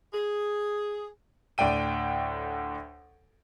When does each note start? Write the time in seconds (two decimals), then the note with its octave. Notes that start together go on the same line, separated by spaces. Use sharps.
0.13 G#4
1.58 D2 A2 D4 G5 D#7